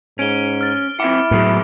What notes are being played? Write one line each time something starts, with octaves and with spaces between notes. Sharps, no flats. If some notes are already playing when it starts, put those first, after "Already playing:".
G#2 C#4 D7 G7
F6 A6
C4 E4 E5 F#5 D6
C#2 A2 F#3 B3 G#4